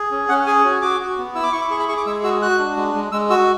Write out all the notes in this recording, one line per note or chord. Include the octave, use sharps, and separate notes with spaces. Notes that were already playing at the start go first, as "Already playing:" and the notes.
Already playing: G#4
C#4
C#4 F#5
G#4 G#5
F#4
F#4 D6
F#4
B3
E4 E6
D6
E4 C#6
D6
G#4 C#6
B5
G#4 C#6
D6
G#3 E6
F#4 E6
F#4 F#6
D4
G#3
G#3
G#3 E6
F#4 E6